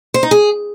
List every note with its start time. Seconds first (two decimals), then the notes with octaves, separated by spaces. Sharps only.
0.14 C5
0.23 D#4
0.31 G#4